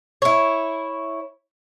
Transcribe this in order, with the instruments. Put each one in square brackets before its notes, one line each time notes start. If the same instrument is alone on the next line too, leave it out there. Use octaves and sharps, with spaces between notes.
[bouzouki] E4 C#5